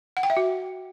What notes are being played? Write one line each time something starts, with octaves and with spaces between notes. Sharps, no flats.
F#5
G5
E5
F#4